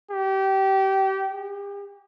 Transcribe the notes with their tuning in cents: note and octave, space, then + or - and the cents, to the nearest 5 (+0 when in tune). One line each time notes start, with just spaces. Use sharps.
G4 -25
G4 +45